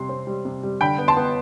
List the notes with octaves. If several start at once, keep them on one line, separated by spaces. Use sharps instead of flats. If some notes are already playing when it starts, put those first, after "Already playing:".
Already playing: C3 G3 C6
C4
G3
C3
G3
D3 G5 B5
B3
A5 C6
B3